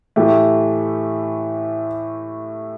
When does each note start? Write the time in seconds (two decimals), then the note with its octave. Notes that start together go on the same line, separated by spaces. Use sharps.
0.16 A2 E3 A3 G4